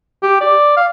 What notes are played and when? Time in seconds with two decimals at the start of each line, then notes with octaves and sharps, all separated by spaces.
0.23 G4
0.41 D5
0.77 F5